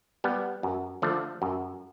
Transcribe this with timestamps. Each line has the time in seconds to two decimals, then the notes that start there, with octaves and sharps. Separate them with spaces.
0.24 G3 B3
0.63 F#2
1.02 D3 F3 A3
1.42 F#2